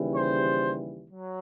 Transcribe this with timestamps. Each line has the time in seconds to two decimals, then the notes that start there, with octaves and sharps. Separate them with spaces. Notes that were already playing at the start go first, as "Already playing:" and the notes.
Already playing: D#2 C#3 E3 G3
0.15 C5
1.10 F#3